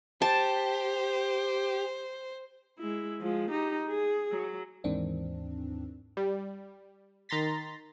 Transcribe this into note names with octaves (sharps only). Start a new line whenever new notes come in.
G4 C5 A5
G#3 E4
F3 G#3
D#4 G4
G#4
F#3
D#2 G#2 D#3 E3 C4 D4
G3
D#3 A#5 C6 A6 B6